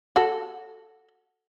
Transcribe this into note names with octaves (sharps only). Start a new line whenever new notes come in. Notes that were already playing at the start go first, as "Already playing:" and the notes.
F#4 A4